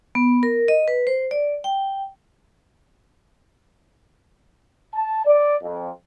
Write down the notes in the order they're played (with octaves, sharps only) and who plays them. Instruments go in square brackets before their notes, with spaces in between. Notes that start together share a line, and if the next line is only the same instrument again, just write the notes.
[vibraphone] B3
A#4
D#5
B4
C5
D5
G5
[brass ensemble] A5
D5
F2